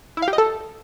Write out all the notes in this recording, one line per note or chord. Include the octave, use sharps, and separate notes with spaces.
E4
F5
G4
D#5
A4